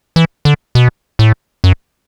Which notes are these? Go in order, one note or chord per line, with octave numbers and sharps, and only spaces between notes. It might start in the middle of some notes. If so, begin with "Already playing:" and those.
E3
D3
B2
A2
F#2